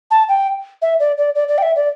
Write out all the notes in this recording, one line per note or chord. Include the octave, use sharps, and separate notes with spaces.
A5
G5
E5
D5
D5
D5
D5
G5
E5
D5